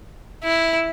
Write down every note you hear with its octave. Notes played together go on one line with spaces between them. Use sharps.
E4